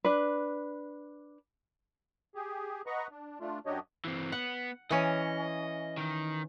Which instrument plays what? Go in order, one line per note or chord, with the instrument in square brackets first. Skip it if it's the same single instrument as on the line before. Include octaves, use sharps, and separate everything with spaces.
[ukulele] D4 B4
[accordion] G4 G#4
B4 D#5 F#5 A#5 C#6
D4
A3 D4 F4
F#2 F#3 D4 G4 C#5 D#5
[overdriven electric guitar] E3 C4
[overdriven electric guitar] B3 [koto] F#5
[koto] E3 C#4 [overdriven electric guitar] D#5
[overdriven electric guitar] D#3